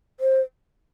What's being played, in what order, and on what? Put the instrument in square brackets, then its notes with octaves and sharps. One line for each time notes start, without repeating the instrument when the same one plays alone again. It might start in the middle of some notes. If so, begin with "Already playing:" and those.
[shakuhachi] C5